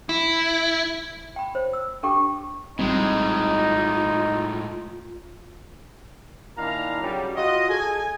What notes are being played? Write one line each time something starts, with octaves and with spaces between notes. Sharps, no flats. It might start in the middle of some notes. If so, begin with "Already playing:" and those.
E4
G5 B5
C5 C#5
E6
D4 G4 A4 G5 C#6 D6
A#1 A2 G3 G#3 C4 D#4 F4
A#2 D#3 D4 E4 F5 A#5
C#3 F#3 G3
F4 F#4 D#5
G#4 A4 G#5